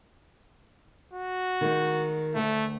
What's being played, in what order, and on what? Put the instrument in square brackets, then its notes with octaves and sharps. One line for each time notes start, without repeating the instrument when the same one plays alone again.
[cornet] F#4
[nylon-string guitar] D#3 G#3
[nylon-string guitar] D2 F#5 [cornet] A3